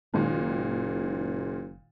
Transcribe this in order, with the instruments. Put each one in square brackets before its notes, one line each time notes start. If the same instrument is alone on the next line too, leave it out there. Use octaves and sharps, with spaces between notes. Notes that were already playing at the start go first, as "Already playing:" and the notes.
[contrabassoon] F#1 [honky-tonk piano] A#2 D#3 G#3